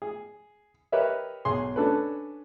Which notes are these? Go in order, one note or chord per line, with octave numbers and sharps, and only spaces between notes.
G#4
G4 A#4 B4 C#5 D#5 E5
B1 G#4 C6
C#4 D4 A4 B4